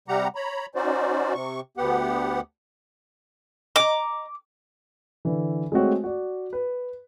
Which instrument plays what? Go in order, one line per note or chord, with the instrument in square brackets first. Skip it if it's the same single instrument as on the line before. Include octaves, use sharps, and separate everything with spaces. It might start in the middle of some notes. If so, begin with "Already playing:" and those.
[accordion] C3 G3 G4 F#5 A#5
C#5 A#5 B5
C#4 D#4 F#4 C5 D5
C3 C#6
D2 B3 G4 F#5
[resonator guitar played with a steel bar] D#5 A#5 [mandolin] D6
[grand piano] D3 E3
G#3 A3 C4 F#4 C#5
F#4 D5
B4